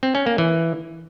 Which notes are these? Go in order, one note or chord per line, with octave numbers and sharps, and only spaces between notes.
C4
C#4
A#3
E3